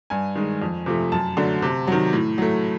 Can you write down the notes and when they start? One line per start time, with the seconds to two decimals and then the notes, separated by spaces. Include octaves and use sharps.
0.10 G2 G#5
0.35 D#3 G#3
0.62 F2
0.86 C3 F3 A3
1.12 F#2 A5
1.37 D3 F#3 A3
1.62 C3
1.87 D#3 F#3
2.13 A2
2.38 F#3 A3